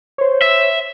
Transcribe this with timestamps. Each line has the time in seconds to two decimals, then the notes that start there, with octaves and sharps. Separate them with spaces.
0.18 C5 C#5
0.42 E5